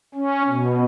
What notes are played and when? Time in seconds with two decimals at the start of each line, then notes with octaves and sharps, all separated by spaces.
0.15 C#4
0.48 B2